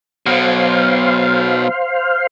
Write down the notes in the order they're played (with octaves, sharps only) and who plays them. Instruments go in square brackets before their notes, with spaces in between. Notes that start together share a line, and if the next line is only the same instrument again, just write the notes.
[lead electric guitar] B2 F#3 [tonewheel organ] C5 F5